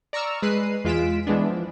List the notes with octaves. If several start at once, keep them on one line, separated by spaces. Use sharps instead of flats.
D5 A#5 C#6 E6 F6
G#3 B4 F#6 C7 D#7
E2 G#3 F4 B6 D7 E7
E3 G#3 B3 D4
F3